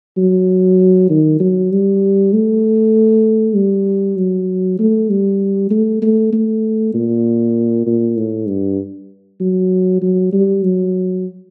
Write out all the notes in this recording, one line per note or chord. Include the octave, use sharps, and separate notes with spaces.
F#3
D#3
F#3
G3
A3
G3
F#3
A3
G3
A3
A3
A3
A#2
A#2
A2
G2
F#3
F#3
G3
F#3